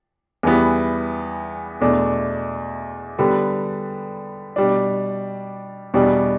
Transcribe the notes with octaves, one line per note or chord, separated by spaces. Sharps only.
E2 E3 G3 B3
E2 B2 A3 D4
D3 G3 B3
B2 G3 D4
E2 B2 G3 D4